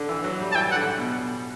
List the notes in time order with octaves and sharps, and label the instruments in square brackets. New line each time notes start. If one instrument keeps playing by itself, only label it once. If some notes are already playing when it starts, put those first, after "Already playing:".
Already playing: [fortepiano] D3
E3
F#3
G3
[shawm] A5
[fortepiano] E3 [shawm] G5
[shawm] F#5
[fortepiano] D3
B2